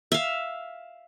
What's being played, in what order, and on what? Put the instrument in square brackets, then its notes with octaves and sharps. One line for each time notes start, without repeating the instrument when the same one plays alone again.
[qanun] E5 F5